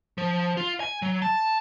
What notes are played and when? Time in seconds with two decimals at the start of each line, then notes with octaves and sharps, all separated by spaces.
0.18 F3
0.57 F4
0.80 G#5
1.02 F#3
1.22 A5